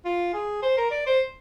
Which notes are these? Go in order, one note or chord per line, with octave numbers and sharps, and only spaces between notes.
F4
G#4
C5
A#4
D5
C5